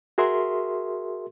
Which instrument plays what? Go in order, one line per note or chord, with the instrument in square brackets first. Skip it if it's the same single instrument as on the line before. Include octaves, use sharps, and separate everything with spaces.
[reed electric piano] F#4 G#4 A#4 E5 C6